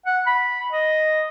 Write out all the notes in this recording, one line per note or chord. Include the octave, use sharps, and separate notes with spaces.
F#5
B5
D#5